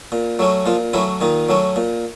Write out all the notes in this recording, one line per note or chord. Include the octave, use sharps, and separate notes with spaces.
A#2
F#3 A3 C#4
A#2 F3 F4
E3 F#3 A3 C#4 E4
A#2 D#3 D#4
F#3 A3 C#4
A#2